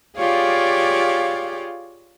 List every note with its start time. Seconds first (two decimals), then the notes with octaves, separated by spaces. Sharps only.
0.16 F4 G4 G#4 C#5 D5 F5